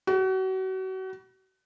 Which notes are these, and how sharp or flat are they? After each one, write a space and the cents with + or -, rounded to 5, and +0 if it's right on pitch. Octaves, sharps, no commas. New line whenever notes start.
F#4 +35